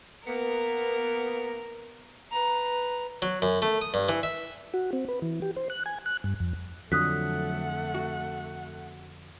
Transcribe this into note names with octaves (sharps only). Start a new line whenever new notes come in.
A#3 B3 A#4
B4 A#5
F#3
F#2
A3
D#6
G2
E3
E5
F#4
C4
B4
E3
G4
C5
F#6
G#5
F#6
G2
F2
F2 D3 F#3 A3 F#5 D#6 F#6 B6
F#4